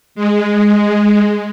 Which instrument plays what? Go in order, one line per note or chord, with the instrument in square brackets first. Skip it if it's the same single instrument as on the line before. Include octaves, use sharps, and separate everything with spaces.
[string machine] G#3